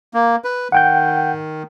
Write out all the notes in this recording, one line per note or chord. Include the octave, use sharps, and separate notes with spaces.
A#3
B4
D#3 F#5 G5 G6